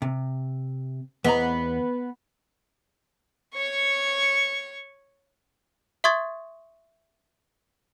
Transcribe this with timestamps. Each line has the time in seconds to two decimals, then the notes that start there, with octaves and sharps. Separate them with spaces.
0.02 C3
1.24 E2 B3 D#5 A#5
3.54 C#5 C#6
6.04 E5 C6 C#6 D#6 G#6 A6